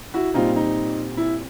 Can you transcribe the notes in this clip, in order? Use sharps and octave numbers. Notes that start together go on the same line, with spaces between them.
E4 F#4
A#2 G3 C4 D#4 F4
D#4
E4